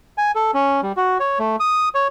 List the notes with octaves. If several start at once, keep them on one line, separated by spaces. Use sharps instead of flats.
G#5
A4
C#4
G3
F#4
C#5
A3
D#6
C#5